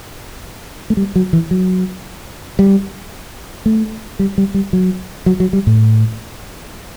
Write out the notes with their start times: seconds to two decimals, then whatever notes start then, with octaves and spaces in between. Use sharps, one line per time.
0.90 A3
0.97 G3
1.16 F#3
1.33 E3
1.51 F#3
2.59 G3
3.66 A3
4.19 G3
4.38 G3
4.54 G3
4.73 F#3
5.26 F#3
5.40 F#3
5.53 G3
5.67 A2